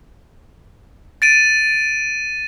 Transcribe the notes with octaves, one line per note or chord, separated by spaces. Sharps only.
A6 D7 D#7